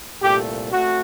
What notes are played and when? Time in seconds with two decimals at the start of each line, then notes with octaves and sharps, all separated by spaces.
0.21 C2 A#2 A3 G4
0.72 A3 C4 F#4